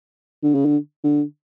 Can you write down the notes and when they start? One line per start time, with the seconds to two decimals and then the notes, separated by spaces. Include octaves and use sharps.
0.43 D3
0.54 C#3
0.65 D3
1.04 D3